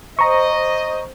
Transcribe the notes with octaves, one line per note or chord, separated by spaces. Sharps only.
C5 D#5 A#5 C#6